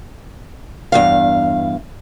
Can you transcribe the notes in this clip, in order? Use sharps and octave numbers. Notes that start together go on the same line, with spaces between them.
E2 G2 F5